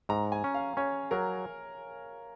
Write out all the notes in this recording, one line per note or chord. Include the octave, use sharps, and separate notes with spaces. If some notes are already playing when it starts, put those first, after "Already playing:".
G#2 A#5
G#5
C#4
F5
C#4 C#5
F#3 A#4